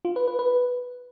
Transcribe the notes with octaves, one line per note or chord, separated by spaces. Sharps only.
F4
B4
B4
B4